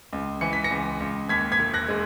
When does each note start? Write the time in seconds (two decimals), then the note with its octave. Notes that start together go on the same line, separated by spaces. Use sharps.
0.13 C#2
0.41 E3 C#7
0.53 B6
0.64 A#6 C#7
0.71 C#2
1.00 C#2
1.29 D#2 G#6 B6
1.52 G#6 B6
1.59 E1
1.74 F#6 A#6
1.89 G#3